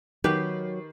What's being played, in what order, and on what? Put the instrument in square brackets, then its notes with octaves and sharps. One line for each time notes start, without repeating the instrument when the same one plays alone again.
[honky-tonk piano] D#3 [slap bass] F#3 [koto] G4 B4